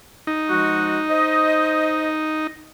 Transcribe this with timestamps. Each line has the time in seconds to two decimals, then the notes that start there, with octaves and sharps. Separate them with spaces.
0.27 D#4
0.49 F3 G#3 F#4
1.09 C5 D#5